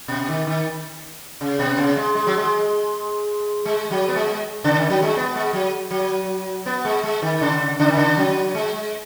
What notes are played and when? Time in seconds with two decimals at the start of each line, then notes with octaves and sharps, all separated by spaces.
0.08 B2
0.28 D#3
0.47 D#3
1.41 C#3
1.59 B2
1.78 C#3
1.97 G#3
2.15 G#3
2.27 F#3
2.37 G#3
3.65 G#3
3.91 F#3
4.08 B3
4.16 G#3
4.64 C#3
4.77 D#3
4.90 F#3
5.02 G#3
5.17 B3
5.35 G#3
5.53 F#3
5.91 F#3
6.66 B3
6.85 G#3
7.03 G#3
7.22 D#3
7.41 C#3
7.80 C#3
7.89 D#3
7.97 C#3
8.17 F#3
8.55 G#3